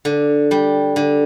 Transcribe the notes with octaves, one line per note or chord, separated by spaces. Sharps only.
D3
G3
D3